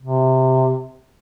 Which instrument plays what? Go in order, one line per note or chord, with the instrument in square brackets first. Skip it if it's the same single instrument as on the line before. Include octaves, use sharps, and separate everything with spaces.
[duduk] C3